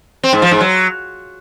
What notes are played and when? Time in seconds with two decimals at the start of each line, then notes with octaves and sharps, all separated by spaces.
0.23 C4
0.33 G#2
0.42 F3
0.51 G#2
0.61 F#3